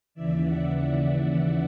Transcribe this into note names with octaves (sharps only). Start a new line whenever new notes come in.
D#2 C#3 E3 D5 E5
E5 F#5